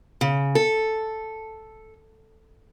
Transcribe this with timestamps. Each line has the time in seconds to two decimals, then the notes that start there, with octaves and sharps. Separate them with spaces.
0.21 C#3
0.55 A4